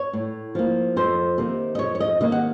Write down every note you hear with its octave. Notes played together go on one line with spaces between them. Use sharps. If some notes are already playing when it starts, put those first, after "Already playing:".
Already playing: C#5
A2
F3 A#3
F2 C5
C3 D#3 A#3
D#5
F2 C#5
C#5
D#5
C3 D#3 A#3 D#5
F#5